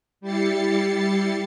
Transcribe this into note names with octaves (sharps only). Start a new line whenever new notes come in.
G3 E4 G4 A6 C7 C#7